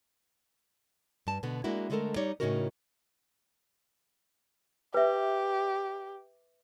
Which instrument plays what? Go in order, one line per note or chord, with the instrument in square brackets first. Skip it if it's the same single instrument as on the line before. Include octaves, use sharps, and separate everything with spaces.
[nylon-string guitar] G2 A5
B2 D3 B3
G#3 A#3 D4 E4 F#4
D3 G#3 A3 B3 A4 A#4
G3 D#4 C#5 D5
A2 C#3 C#4 D#4 F#4 A#4
[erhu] G4 [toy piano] B4 E5